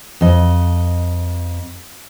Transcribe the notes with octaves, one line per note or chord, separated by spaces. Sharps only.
F2 D#5